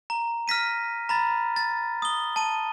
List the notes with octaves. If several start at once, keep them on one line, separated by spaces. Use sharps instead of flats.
A#5
F6 A#6 B6 D#7
A#5 B5 A6
A6
D#6 G7
A5 D#7